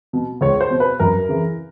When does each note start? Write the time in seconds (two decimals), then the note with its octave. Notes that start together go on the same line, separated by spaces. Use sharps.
0.13 B2
0.41 C#2 C#5
0.61 C5
0.71 B2
0.80 B4
1.00 F#2 A#4
1.29 C#3 E3